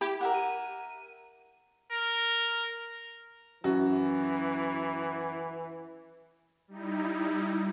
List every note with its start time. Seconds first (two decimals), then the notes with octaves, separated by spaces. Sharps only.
0.01 E4 G4
0.21 A#4 E5 F#5
0.34 D#7
1.91 A#4
3.64 F#2 E3 F#4
6.68 G3 D#4 E4